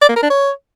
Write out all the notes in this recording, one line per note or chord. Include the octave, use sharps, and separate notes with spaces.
D5
A#3
A#4
D4
C#5